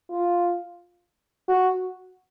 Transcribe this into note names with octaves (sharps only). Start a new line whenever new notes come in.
F4
F#4